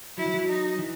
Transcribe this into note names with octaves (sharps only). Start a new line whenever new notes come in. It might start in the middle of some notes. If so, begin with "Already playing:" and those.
F#3 E4
E3
F#3
D#4
E3